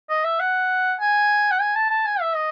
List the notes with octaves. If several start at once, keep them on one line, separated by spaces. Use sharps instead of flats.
D#5
E5
F#5
G#5
F#5
G#5
A5
A5
G#5
E5
D#5